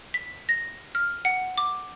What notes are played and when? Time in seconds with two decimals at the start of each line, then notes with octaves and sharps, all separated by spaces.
0.14 B6
0.49 A#6
0.95 F6
1.25 F#5
1.58 D6